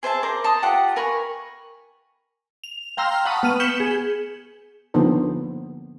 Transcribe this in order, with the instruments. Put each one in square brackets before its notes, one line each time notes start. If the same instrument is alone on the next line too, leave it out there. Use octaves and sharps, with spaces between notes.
[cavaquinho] G#4 C5 E5 A5
A#4 C5 D5 D6
A5 A#5 C6 D#6
F4 G4 A4 F#5
A#4 G#5 B5 C#6
[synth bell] F7
F5 G5 A#5 C6 E6 F6
F#5 A5 B5 C#6 D#6
B3 F6 D#7
G6 B6 C#7 E7 F#7 G7
G#4
[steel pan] D3 F3 A#3 B3 D#4 C5